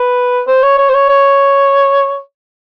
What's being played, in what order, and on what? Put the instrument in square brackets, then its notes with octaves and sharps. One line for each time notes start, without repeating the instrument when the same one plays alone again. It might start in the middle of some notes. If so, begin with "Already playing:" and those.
Already playing: [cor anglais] B4
C5
C#5
C#5
C5
C#5
C#5